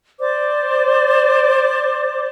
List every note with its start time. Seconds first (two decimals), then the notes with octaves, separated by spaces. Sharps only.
0.19 C5 D5 D6